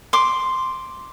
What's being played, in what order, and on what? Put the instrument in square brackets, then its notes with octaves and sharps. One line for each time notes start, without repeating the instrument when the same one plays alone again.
[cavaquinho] C6 D6